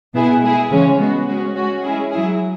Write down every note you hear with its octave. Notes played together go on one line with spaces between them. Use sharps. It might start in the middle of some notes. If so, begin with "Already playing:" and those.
B2 B3 E4 G#4
G#3 E4 G#4
C#3 E3 G#3 C#4
G#3 B3 F#4
G#3 C#4 F#4
G#3 C#4 F#4
G#3 C#4 E4 G#4
F#3 E4 G#4